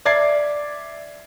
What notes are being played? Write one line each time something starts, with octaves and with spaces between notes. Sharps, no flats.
D5 E5 G#6 A6 C7